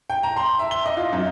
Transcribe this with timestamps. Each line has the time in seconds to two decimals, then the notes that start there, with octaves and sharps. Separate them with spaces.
0.10 G5
0.23 A#5
0.37 C6
0.59 E5
0.71 G7
0.86 D#5
0.97 F4
1.12 F#2